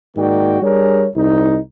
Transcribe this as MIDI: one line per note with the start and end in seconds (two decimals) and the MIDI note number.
0.17 0.59 44
0.17 0.59 51
0.17 0.59 58
0.17 0.59 66
0.17 0.59 74
0.17 0.59 79
0.62 1.07 55
0.62 1.07 62
0.62 1.07 68
0.62 1.07 70
0.62 1.07 73
1.16 1.59 36
1.16 1.59 63